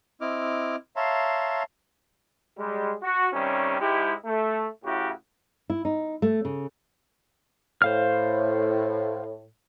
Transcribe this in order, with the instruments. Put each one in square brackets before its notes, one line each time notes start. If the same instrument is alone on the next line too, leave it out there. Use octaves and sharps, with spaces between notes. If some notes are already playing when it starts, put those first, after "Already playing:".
[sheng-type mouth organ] C4 E4 D#5 D6 F6
C#5 E5 F5 A5 A#5 C6
[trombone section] G3 G#3
F#4
C3 D#3 G3 C#4
G#2 G#3 E4 G4
A3
A2 C#3 E4 F#4 G4
[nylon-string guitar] E4
D#4
A3
C#3
[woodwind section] A2 [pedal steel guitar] C5 F5 F6